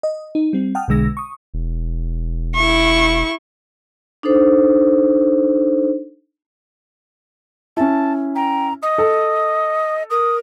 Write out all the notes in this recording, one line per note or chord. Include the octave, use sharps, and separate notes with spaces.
D#5
D#4
G3 C4
F#5 G5 A5 D#6 F6
B1 B2 D3 G#3 E6 A#6
C#6 D#6
E1
E4 C#6
D4 D#4 A4 C5
C#4 E4 A5
G5 A#5
D#5 D#6
A4
A#4 D#6